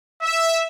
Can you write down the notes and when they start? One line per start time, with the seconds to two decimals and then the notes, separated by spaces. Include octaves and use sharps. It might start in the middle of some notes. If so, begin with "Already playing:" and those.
0.22 E5